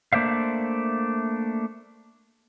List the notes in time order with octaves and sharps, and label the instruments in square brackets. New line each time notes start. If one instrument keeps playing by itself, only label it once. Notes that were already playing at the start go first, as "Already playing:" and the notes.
[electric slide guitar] A3 A#3 D4 C5 E5 F5